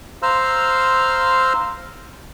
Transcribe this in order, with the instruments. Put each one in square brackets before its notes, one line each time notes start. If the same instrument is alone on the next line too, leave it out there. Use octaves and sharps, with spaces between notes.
[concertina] C5 F5 A#5 C6 E6 F6